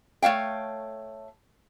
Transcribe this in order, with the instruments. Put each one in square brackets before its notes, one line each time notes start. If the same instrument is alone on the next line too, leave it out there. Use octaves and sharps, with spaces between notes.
[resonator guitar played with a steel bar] A3 C#5 F5 G5